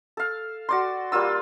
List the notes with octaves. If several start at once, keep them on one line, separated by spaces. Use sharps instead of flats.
A4 F5
F#4 D5 C6
G3 A#3 F4 E6